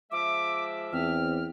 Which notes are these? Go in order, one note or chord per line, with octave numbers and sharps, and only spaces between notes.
F3 G#3 E5 D6
E2 C4 F6